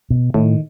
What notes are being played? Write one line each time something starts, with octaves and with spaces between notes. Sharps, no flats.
B2
A2 D#3